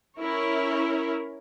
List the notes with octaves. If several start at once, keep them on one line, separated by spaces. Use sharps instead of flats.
C#4 E4 A#4 C#5